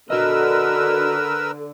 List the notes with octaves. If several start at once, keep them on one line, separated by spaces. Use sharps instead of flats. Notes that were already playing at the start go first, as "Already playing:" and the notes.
D3 F#4 A#4 B4 D#5 E6